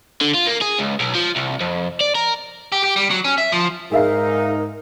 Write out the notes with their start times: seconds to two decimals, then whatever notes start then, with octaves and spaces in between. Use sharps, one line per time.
0.21 D3
0.34 F4
0.47 A#3
0.62 G#4
0.79 C#2
1.00 B1
1.15 F3
1.36 C2
1.61 F2
2.01 D5
2.15 A#4
2.72 G4
2.84 G4
2.96 G3
3.11 F#3
3.25 C#4
3.38 E5
3.52 F3
3.92 G#2 D#4 G#4 A#4 E5 F5